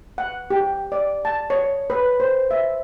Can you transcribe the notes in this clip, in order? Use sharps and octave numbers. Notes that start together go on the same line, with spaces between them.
F#5
G4
D5
A5
C#5
B4
C5
E5